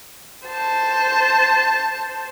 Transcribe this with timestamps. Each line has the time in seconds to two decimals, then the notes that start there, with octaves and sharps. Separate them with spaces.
0.47 C5 A5